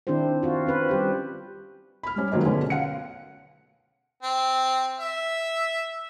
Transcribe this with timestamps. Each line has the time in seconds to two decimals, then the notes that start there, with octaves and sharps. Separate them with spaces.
0.07 D#3 C4 D4 E4 G4 C5
0.43 C4 F4 F#4
0.66 C4 C#4 B4 C5
0.89 G3 G4 C5
2.03 B5 F6
2.16 G3 C#4
2.32 D#3 F3 F#3 A#3 D#4
2.43 B2 D3 C#4 G#4 B4
2.70 F5 F#5 C#7
4.23 C4
5.00 E5